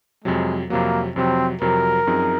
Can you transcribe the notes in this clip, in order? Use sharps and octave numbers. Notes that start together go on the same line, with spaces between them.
F2 C3 F#3 G#3
F2 C3 F#3 A#3
F2 C3 F#3 C4
F2 C3 F#3 A#4
F#2 F3 C4 D#4 G#4